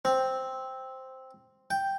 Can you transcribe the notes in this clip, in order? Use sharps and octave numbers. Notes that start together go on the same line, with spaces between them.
C4
G5